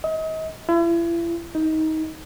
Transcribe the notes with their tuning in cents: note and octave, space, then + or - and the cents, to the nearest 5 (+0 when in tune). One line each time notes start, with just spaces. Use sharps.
D#5 +35
E4 +40
D#4 +20